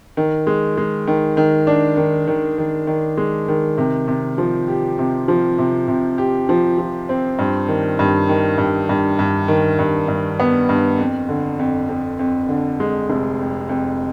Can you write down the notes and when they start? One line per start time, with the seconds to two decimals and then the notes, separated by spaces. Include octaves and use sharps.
0.17 D#3
0.47 G#3
0.77 G#3
1.07 D#3
1.37 D#3
1.67 D4
1.97 D#3
2.28 D#3
2.58 D#3
2.87 D#3
3.18 G#3
3.48 D#3
3.78 C3
4.08 C3
4.38 F3
4.68 G4
4.99 C3
5.28 F3
5.58 C3
5.88 C3
6.18 G4
6.49 F3
6.78 F3
7.09 C4
7.39 G2
7.68 D#3
7.99 G2
8.29 D#3
8.58 G2
8.89 G2
9.19 G2
9.48 D#3
9.79 G2
10.08 G2
10.40 B3
10.69 G2
10.99 F2
11.29 D3
11.59 F2
11.89 F2
12.19 F2
12.49 D3
12.80 G#3
13.10 F1
13.40 F2
13.69 F2